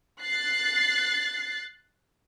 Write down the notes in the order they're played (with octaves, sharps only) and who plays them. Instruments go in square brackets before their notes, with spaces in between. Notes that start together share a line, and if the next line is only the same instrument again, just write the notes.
[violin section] F#6 A6 C7